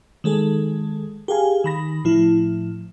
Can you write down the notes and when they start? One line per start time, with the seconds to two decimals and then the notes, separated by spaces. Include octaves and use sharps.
0.24 D#3 G#3 G#4 A4
1.28 G4 G#4 F5 G#5
1.64 D#3 B5 A#6
2.04 A2 F3 E4